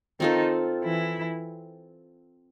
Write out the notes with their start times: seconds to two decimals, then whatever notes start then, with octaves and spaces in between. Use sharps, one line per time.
0.20 D#3 C4 D#4 F4 A4
0.84 E3 E4